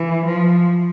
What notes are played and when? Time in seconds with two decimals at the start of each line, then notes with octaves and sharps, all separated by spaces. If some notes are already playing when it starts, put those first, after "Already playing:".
Already playing: E3
0.26 F3